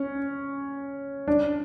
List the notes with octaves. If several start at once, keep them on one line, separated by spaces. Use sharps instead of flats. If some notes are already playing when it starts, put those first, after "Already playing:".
Already playing: C#4
D4